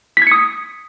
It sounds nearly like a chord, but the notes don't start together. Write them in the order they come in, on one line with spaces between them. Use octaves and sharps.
B6 G#6 C#7 D#6